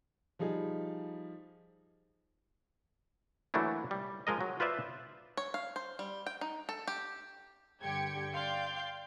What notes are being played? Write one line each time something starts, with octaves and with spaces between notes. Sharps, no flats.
F3 G3 D#4 G#4
E3 F#3 A3 A#3 D4 E4
G3
F3 G#3 A#4 D#5
F#3
F4 B4 C5 D5 E5
C#5
F5
C5
G3
G5
D#4
A4
G4
G2 D3 G4 G5 G#6 C#7
D5 F5 G5 C6 G6